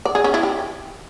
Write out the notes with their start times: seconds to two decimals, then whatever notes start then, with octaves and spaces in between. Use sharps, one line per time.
0.05 D5
0.15 G#4
0.24 C#4
0.34 E4
0.43 G4